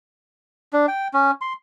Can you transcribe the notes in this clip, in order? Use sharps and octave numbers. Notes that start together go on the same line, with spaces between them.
D4
G5
C#4
C6